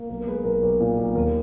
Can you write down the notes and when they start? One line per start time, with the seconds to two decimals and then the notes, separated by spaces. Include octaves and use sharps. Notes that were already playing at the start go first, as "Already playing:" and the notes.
Already playing: A#3
0.09 B1 A#4
0.22 A#4
0.27 G#3 G#4 B4
0.45 B1 A#4
0.62 B1 A#4
0.80 A#2
0.97 B1
1.15 D#2 A#4